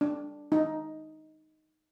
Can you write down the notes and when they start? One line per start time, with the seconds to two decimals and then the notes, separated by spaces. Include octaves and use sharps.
0.01 D4
0.52 D#4